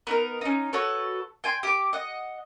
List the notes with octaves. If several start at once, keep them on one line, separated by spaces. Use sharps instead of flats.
B3 D#4 A#4
C#4 D#4
F#4 A4 B4 C#5
G5 G#5 C6
G4 D6
D#5 F#5